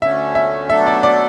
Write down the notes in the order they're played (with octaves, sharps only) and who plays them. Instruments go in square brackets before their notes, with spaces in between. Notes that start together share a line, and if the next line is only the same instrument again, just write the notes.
[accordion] D2 D3 A3 C#4 [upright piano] E5
[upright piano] E5
[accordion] B2 F#3 A3 D4 A4 [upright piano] E5
[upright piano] D5
D5